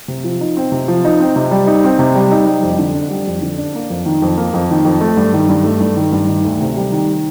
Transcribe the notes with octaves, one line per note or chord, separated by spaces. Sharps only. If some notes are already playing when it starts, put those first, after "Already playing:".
C3
F3
D#4
C4
C3
F3
D#4
C4
C3
G3
D#4
C4
C3
G3
D#4
G3
F2
D3
D4
G3
F2
D3
D4
A#3
F2
D#3
F2
A#3
F2
D#3
F2
A3
G2
D#3
G2
A3
G2
D#3
G2
D#3
D2
C3
G3
D#3